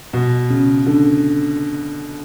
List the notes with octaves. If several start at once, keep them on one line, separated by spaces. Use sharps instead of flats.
B2
C#3
D3